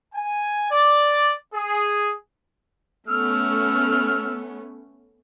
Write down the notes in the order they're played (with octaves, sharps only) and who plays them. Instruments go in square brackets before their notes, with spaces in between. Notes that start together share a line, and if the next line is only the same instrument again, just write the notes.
[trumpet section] G#5
D5
G#4
[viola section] A3 B3 C#4 [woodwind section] E6 F6